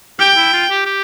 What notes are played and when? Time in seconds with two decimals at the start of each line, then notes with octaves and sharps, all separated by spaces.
0.19 G4 G5
0.37 E4
0.53 F4
0.70 G4
0.86 G4